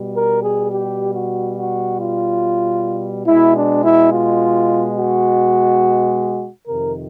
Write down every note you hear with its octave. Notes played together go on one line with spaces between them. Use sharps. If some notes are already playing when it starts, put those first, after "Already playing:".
Already playing: B2 G3
A#4
G#4
G4
F#4
F#4
F4
B2 G#3 E4
D4
E4
F4
F#4
F2 C3 D#3 A#4